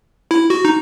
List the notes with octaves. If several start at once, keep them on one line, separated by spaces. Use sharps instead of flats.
E4
F#4
D#4